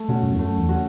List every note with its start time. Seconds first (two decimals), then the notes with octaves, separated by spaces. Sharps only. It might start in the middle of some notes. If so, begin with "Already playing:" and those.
Already playing: A3
0.09 B2 C#4 F#4
0.23 F#2
0.33 E2
0.39 F#2 A3
0.59 E2
0.69 C#4 F#4